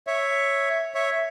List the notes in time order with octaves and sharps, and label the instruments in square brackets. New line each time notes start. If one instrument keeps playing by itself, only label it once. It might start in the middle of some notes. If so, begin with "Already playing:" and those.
[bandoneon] C#5 E5
C#5 E5